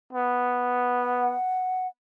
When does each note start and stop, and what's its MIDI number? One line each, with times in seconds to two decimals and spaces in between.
0.13 1.35 59
1.01 1.87 78